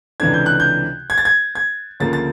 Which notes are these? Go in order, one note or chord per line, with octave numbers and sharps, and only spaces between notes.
C#2 C3 E3 A3 D4 G#6
G6
F#6
G6
G#6
A6
G#6
G#6
D2 C#3 F3 A#3 A6
A6